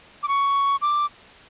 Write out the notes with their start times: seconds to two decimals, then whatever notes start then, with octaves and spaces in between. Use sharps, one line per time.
0.23 D6
0.28 C#6
0.82 D6